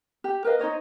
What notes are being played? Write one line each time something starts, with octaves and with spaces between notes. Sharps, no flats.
G4
A#4 B4 D#5 F5
D#4 C5 C#5 D#5